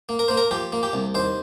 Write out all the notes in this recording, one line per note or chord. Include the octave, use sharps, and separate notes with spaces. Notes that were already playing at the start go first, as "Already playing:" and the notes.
A#3
A#4
A#3 C5
A#4
F3 G4
A#3
G4
C2
D#2 C5